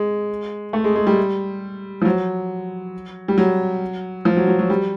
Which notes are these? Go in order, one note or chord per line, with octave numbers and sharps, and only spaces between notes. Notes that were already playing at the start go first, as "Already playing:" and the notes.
Already playing: G#3
A3
G#3
G#3
G3
F3
F#3
G3
F#3
F3
F#3
F#3
F#3
G3